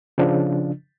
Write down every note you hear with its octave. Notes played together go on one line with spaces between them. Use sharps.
C#3 F3 D4